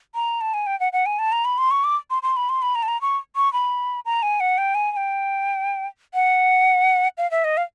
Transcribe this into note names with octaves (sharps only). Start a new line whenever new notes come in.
A#5
A5
G#5
G5
F#5
F#5
G#5
A5
A#5
B5
C6
C#6
D6
C6
C6
B5
C6
B5
A#5
A5
A#5
C#6
C#6
B5
A#5
G#5
F#5
G5
G#5
G#5
G5
F#5
F5
E5
D#5
F5